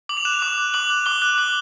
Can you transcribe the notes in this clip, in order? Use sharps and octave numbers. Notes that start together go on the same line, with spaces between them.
D6 F#7
F7
F#6 E7
F7
D6
F#6
D6 F#7
F#6
D6 G7
F#6
D6 F#7